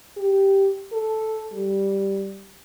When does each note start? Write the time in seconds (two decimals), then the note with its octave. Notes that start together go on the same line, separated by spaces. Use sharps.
0.17 G4
0.93 A4
1.53 G3